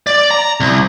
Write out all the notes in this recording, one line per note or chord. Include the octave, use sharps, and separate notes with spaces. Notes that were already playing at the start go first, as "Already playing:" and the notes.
D5
A#5
C2